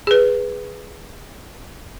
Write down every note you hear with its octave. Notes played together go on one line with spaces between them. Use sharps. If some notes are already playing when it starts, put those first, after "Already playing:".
G#4 B4